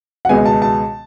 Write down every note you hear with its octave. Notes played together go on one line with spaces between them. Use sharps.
F#5
C#2 B2 G#3 B3 G#5
A5
A5